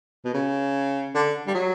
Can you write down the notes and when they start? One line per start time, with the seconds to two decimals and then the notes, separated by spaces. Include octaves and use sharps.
0.25 B2
0.34 C#3
1.15 D3
1.47 G3
1.54 F#3